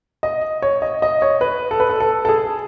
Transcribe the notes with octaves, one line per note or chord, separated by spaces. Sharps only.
D#5
C#5
D#5
D#5
C#5
B4
A4
B4
A4
A4
A4
G#4